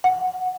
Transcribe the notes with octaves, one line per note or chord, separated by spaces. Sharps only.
F#5